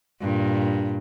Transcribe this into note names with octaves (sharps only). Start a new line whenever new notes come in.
G2 A#2